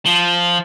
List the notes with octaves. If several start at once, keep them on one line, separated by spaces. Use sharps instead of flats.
F3